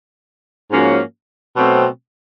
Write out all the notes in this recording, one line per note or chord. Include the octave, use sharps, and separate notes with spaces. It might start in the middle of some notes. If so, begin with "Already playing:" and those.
G#2 F3 A#3 C#4 F#4
B2 F#3 A3 C4